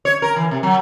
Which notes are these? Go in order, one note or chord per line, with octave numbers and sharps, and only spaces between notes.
C#5
A#4
E3
C3
F#3